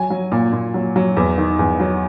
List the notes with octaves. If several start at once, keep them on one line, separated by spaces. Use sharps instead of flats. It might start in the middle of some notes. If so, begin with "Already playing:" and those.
Already playing: F#3 G#5
F#3
A#2
A#2
F#3
F#3
E2
D#3
E2
F#3